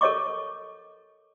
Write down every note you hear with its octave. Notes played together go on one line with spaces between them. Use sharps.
A4 A#4 C#5 D#5 C#6 D6